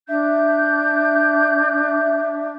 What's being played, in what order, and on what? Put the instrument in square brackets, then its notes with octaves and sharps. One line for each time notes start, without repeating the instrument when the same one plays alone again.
[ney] D4 [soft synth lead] E5 [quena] G6